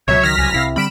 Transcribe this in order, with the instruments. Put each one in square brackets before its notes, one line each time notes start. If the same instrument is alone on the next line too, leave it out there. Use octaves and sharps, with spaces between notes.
[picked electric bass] C#2 F#3 [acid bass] B2 [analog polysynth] C#5 E5 [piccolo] G#6
[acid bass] D#3 [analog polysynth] F6 A#6 B6
[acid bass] C2 [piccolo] G#5
[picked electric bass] C2 C3 [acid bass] E4 [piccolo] F5
[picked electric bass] D3 G3 C4 [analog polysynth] B5 D7 E7 [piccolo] F6